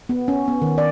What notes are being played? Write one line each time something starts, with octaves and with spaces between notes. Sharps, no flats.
B3
C#4
B3
D#3
D5